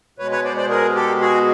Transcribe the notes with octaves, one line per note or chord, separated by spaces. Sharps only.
B2 G#3 B4 C#5
B4 C#5
C5 D5
C5 D5
G#4 A#4
G4 A4
F#4 G#4